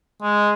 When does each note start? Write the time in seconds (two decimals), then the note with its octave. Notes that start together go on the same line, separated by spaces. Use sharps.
0.22 G#3